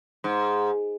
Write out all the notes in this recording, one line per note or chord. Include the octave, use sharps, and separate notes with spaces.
G#2